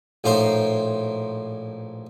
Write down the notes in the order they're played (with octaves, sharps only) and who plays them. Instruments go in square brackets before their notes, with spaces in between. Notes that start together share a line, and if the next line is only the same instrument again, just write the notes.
[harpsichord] A#1 A2 D#4 C5 G5 C6